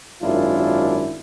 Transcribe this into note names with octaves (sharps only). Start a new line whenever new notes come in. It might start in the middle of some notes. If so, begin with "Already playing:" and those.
G#1 F#2 D4 E4 F4